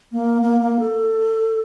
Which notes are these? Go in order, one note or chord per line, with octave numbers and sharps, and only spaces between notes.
A#3
A#3
A#3
A4